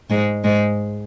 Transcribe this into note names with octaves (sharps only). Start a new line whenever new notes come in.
G#2 G#3
G#2 G#3